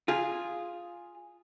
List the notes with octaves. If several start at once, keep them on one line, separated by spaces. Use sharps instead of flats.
F4 G#4